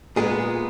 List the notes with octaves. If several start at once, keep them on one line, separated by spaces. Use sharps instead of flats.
A#2 G#3 B3 G#4